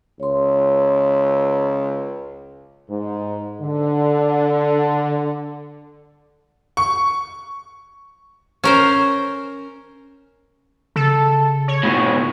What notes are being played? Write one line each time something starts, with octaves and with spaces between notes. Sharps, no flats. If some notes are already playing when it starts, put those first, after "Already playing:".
C#2 C#5 C6
G#2
D3
C#6
C#4 A#4 C5
C#3 A4
C#5
G#2 B2